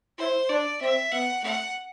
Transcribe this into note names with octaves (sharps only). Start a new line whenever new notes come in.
E4 C5
D4 D5
C4 E5
B3 F#5
A3 F#5